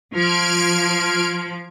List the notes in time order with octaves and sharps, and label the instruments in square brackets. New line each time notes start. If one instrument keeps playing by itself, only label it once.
[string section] F3 [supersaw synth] F6 G#6 D7